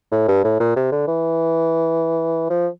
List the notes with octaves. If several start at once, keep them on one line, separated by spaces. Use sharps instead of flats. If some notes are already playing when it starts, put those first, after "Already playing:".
A2
G2
A2
A#2
C3
D3
E3
F3